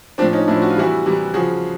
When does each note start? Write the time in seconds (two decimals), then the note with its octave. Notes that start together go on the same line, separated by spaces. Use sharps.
0.18 F3 C4 D4
0.22 A2
0.33 C#4 D#4
0.48 A2 F3 D4 E4
0.62 F#4
0.70 F4
0.76 C3 E3 G3 E4 F#4
1.06 C3 E3 G3
1.34 C#3 F3 F#4 G#4